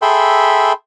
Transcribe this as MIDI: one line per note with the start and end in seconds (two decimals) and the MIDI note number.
0.02 0.73 68
0.02 0.73 69
0.02 0.73 76
0.02 0.73 79
0.02 0.73 83
0.02 0.73 84